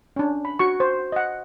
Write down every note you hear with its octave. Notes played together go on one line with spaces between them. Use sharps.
C#4 D4
B5
F#4 C#6
C5
D#5 F#5